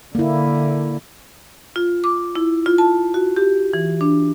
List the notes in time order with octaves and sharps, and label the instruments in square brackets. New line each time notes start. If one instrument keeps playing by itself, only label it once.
[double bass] D3 [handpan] A#3 E4
[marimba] F4
D6
E4
F4
A5
F#4
G4
E3
D4